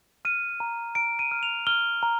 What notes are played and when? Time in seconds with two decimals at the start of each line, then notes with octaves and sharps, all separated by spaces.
0.25 F6 D#7
0.60 A#5
0.95 A#5 D7
1.19 D#7
1.31 F6
1.43 F7
1.67 F6 G7
2.03 A#5